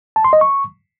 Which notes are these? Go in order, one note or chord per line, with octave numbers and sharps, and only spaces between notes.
A5
C6
D#5
C#6